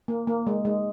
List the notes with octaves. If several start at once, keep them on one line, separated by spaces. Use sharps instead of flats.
A#3
A#3
G#3
G#3